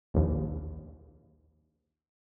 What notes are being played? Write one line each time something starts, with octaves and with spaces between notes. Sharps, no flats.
A#1 D#2